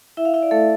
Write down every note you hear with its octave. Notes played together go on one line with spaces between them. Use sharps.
E4 E5
F5
E4 E5
D5
A3 A4